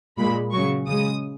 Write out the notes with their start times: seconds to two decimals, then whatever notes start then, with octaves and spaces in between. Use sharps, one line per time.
0.18 A#2 G#3 B5
0.53 C#3 F#3 C#6
0.87 C#3 G#3 D#6